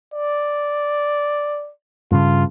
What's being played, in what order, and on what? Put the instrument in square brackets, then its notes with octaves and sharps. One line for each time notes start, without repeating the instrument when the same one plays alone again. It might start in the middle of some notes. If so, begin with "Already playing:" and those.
[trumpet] D5
[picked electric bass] G2 C#3 [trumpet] F4